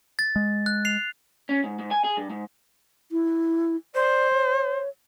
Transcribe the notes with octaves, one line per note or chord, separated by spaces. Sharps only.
A6
G#3
F#6
C7 F7
C#4
G#2
G#2
G#5
G#4
G2
G#2
E4
C5 D5
C#5